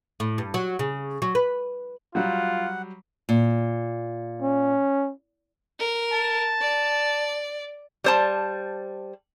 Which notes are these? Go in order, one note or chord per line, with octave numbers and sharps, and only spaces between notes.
A2
G2
F#3
C#3
F#3
B4
F#3 G3 F4 F#5
A#2
C#4
A#4
A5
D5
G3 C5 A5